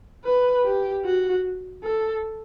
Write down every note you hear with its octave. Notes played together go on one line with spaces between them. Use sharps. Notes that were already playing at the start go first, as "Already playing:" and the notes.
B4
G4
F#4
A4